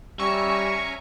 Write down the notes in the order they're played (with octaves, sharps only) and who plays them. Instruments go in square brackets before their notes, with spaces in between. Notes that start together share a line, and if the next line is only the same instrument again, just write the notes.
[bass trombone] G3 [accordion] C#4 G#5 A#5 [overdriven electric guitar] E5 [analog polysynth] C#6